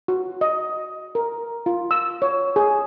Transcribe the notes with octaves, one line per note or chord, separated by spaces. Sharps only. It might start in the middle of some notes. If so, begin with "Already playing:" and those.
F#4
D#5
A#4
F4
E6
C#5
G#4